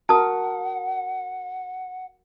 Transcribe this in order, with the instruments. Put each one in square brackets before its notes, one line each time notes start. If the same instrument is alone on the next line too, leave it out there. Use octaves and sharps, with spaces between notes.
[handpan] F#4 A#4 [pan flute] F#5 [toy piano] A5 D#6